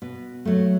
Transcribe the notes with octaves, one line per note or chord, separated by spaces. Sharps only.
B2
F#3 A3